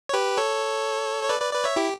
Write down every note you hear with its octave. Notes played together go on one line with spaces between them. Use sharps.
C#5
G4 B4
A4 C#5
C#5
B4 D5
B4 D5
B4 D5
C#5 E5
E4 G4